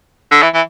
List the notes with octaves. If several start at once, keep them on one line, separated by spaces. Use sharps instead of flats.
D3
E3
E3